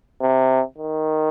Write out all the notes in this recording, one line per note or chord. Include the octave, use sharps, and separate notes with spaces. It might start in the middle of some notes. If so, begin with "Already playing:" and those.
C3
D#3